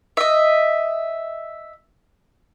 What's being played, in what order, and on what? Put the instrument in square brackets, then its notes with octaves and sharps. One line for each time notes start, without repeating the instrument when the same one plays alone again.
[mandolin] D#5 E5